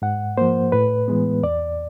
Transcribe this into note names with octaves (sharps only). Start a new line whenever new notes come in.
G#2 F#5
F3 A#3 C5
A2 B4
E3 G#3 B3
E2 D5